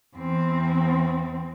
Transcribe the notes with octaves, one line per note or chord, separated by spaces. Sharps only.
E2 C4